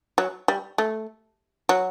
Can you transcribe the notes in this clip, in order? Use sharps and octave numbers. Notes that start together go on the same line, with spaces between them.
F#3
G3
A3
F#3